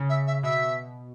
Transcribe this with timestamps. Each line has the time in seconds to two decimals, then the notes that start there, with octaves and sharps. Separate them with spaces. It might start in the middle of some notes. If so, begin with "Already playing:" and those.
Already playing: C#3
0.09 E5
0.27 E5
0.43 B2 E5